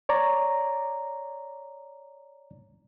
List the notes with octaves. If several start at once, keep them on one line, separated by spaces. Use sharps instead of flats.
C#5 D5 A#5